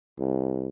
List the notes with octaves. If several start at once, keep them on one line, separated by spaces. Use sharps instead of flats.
C2